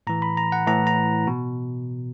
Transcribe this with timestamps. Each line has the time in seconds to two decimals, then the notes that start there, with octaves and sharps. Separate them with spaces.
0.07 A2 E3 A#5
0.22 B5
0.37 A#5
0.52 F#5
0.67 A2 E3 A#5
0.87 A#5
1.27 B2